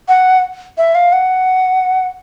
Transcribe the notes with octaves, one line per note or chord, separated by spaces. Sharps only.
F#5
E5
F5
F#5